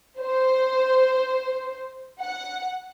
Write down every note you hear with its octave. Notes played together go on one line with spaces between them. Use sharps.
C5
F#5